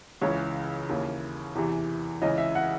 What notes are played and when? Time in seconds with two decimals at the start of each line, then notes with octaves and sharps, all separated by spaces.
0.21 C#2 C#3 E3 C#5
0.89 D#2 C#3 E3
1.55 E2 C3 E3
2.22 C#2 C#3 E3 D#5
2.38 E5
2.55 F#5